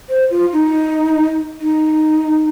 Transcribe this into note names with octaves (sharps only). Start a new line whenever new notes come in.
C5
F4
D#4
D#4